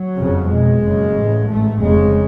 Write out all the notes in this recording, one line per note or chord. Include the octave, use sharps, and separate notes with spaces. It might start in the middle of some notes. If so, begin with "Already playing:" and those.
Already playing: F#3
F#1 F2 C#3
B1 B2 G#3
F#1 F#2 C#3
A1 A2
A1 G#2 A3
F1 F2 C#3 G#3